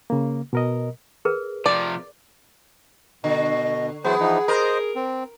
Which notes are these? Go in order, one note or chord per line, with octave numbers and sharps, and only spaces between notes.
C#3 A#3
B2 A#4 D#5
G#4 A#4 B4
C3 F3 D5
B2 D3 D#5
E3 F#3 B3 G#4 C5
E3 F3 D#4
A#4 C5 D#5
C4